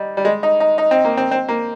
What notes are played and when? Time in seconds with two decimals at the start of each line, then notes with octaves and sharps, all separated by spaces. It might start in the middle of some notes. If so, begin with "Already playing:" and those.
Already playing: G3 D#4
0.17 G3
0.25 G#3
0.43 D#4
0.60 D#4
0.78 D#4
0.91 C4
1.05 A#3
1.17 C4
1.31 C4
1.48 A#3